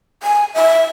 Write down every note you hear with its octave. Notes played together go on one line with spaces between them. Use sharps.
G#5
E5